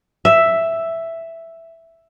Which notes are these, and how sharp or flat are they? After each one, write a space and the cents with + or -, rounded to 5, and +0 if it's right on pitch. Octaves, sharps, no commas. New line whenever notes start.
E5 +5